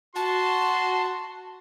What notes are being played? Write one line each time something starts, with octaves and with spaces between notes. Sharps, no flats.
F#4 A5 C6